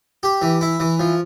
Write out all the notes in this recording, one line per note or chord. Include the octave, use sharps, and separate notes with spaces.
G4
E3
E4
E3
F3